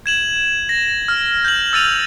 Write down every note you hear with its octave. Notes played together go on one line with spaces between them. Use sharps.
G#6 E7 F#7
A#6
F6
G6 F#7
E6 A6 D#7 F7